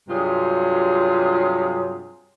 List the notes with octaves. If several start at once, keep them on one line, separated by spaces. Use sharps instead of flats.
G2 C3 F#3 F4 G#4